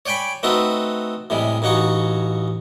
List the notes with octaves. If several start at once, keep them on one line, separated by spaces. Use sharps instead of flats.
C#5 D5 G5 G#5 B5
A3 C4 D#4 F#4 A4 B4
A2 C3 G3 G#3
A1 C#3 D#4 F#4 C#6